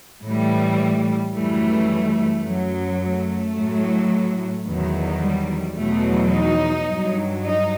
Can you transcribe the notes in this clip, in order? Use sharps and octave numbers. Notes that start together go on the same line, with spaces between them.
A2 E3 G3 A3
F#2 E3 G3 A3
F#2 F#3
A3
A2 F#3
E2 D#3 F#3
G3
E2 B2 F#3 A3
D#4
G2 F#3
D#4